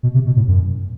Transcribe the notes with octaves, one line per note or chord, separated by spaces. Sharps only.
B2
C3
B2
A2
F#2